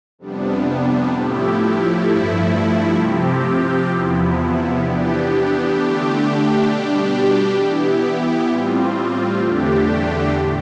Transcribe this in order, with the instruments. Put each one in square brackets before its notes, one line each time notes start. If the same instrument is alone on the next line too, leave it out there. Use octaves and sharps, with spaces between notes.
[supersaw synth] F2 C3 G3 B3 D4
A2 F3 A3 E4 G4
G2 F3 A3 E4
C3 F3 C4 G4
E2 C3 F3 B3 E4
E3 B3 D4 G4
D3 A3 D4 G4
B2 G3 D4 G4
E3 B3 E4 G4
A2 G3 C4 F4
E2 D3 A3 D4 G4
A2